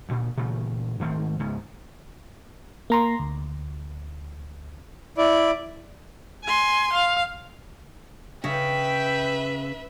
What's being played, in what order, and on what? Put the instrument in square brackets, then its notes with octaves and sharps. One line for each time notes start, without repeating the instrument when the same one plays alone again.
[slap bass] D2 A#2
A#2 C#3 E3 A3
G#2 D#3 A3 C4
C#2 G#2 C#3
[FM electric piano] A#3 A#5 C6
D2
[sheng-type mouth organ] E4 D5
[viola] G#5 C6
F5
[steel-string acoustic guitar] C#3 [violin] B4 E5 [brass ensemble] G5